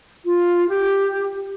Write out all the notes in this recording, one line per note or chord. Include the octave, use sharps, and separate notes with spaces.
F4
G4